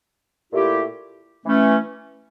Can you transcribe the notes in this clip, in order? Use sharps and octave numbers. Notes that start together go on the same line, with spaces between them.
A#2 A3 E4 G4
E3 A3 C#4